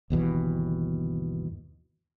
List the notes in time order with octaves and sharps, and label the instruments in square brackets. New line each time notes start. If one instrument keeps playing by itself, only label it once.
[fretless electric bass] G1 D#2 B2 E3